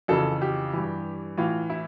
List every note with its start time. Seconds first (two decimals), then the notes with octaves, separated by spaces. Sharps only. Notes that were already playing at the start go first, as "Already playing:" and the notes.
0.08 F2 C#3 E3 A4
0.42 G4
0.73 G2 E3
1.37 A2 E3 F4
1.70 E4